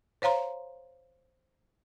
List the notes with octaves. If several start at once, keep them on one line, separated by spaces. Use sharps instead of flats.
C5 C#5 F5 A#5 C6